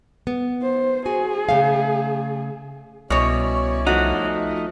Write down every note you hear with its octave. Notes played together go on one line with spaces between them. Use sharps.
B3
C5
F#4 G#4 G#5
C#3 A3 F5
C2 B2 C#4 E4 C#5 D5
F3 A3 D#4 F#4